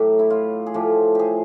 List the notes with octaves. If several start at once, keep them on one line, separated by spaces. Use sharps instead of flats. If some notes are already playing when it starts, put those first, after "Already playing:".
Already playing: A2 F#3 G4
E4
F4
G#4
A2 F3 G4
G4 G#4